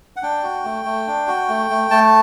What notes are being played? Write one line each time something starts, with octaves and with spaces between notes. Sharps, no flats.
F#5
D4 G5
F#4
A3
A3
D4
F#4
A3
A3
A3 A5